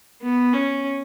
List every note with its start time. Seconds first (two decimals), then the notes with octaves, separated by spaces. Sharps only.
0.22 B3
0.53 C#4